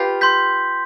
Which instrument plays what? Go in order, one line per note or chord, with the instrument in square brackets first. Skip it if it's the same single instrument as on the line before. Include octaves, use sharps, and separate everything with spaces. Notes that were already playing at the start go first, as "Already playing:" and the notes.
Already playing: [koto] F4 G4 B4
[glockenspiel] C6 G6 B6